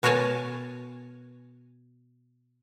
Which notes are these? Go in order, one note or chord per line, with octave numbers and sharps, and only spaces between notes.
B2 F#4 A#4 C#5 G#5 A5